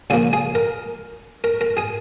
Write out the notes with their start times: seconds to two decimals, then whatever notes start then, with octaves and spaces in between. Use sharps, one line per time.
0.10 C#2 C#3 F3 A#3 G#4 G#5
0.33 G#4 G#5
0.55 A#4 A#5
1.44 A#4 A#5
1.61 A#4 A#5
1.77 G#4 G#5